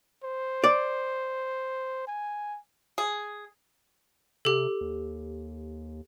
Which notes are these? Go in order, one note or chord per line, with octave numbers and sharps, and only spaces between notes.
C5
D5
G#5
G#4
C3 G4 A4
D#2